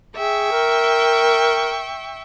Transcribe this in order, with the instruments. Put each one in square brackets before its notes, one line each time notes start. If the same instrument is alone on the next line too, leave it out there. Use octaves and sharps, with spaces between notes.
[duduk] G#4 [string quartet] E5 G5 C#6
[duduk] A#4